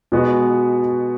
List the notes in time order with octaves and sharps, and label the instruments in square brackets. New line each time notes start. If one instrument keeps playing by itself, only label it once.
[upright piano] B2 G#3 B3 F#4